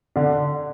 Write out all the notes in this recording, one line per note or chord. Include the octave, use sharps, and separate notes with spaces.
D3 D4